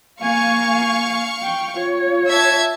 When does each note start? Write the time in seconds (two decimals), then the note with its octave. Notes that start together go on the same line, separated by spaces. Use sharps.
0.21 A#3 F5 G#5 C#6
1.43 G5
1.76 F4 C#5
2.29 E5 A5 G#6